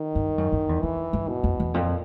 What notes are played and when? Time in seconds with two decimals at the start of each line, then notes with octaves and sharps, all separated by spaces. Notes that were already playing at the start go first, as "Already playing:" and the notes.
Already playing: D#3
0.15 G2
0.38 F#2
0.52 F#2
0.69 E2
0.83 F2 E3
1.13 G2
1.29 B2
1.44 F2
1.60 E2
1.74 F2 A#2